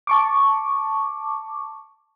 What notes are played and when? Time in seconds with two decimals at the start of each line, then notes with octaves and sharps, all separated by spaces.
0.07 A5 C#6 D6